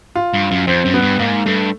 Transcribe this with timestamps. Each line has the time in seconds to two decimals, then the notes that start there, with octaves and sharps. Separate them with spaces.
0.15 F4
0.34 G2
0.51 F#2
0.67 F2 C4
0.85 F#2
0.94 B3
1.02 G2
1.19 G#2 A#3
1.45 G2 A3